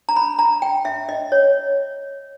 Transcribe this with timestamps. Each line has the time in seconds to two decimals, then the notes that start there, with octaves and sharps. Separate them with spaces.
0.09 A#5
0.16 B5
0.39 A#5
0.62 G5
0.85 E5
1.09 D#5
1.32 C#5